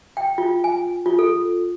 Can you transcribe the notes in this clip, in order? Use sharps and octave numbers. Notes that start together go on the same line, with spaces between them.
G5
F4
G#5
F4
A4